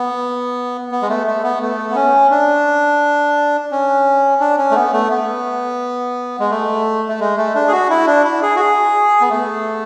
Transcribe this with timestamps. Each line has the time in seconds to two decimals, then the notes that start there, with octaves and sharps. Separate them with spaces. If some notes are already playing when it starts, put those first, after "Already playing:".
Already playing: B3
0.91 B3
1.02 G#3
1.09 A3
1.27 A3
1.43 B3
1.62 A3
1.90 B3
1.96 C#4
2.31 D4
3.71 C#4
4.40 D4
4.58 C#4
4.71 A3
4.76 B3
4.93 A3
5.11 B3
6.40 G#3
6.51 A3
7.09 A3
7.20 G#3
7.38 A3
7.55 D4
7.68 G#4
7.72 F#4
7.90 E4
8.07 D4
8.24 E4
8.42 G#4
8.56 F#4
8.60 G#4
9.21 B3
9.30 A3